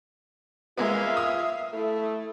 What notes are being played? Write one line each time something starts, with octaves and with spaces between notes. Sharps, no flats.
G#3 A#3 B3 F4 E5 F5
D#6
A3 E4